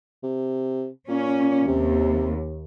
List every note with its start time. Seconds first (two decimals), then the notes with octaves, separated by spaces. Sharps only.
0.23 C3
1.08 A#2 C#4
1.67 D#2 C3